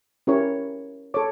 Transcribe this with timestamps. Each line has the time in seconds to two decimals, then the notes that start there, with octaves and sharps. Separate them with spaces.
0.27 C#4 E4 G4 A#4 C#5
1.14 A4 C#5 D6